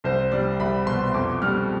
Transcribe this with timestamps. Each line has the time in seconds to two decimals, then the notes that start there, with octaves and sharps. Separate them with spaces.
0.04 C2 C5
0.32 G3 D5
0.60 C2 B5
0.86 B2 C6
1.14 F2 D6
1.42 G3 F6